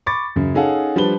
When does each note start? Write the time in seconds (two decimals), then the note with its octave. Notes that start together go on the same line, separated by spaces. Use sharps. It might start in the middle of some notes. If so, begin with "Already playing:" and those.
0.06 B5 C#6 D6 A6
0.36 F#2 C#3
0.55 C#4 D#4 G#4 A4 F5 F#5
0.96 F3 G3 D4 B4 G7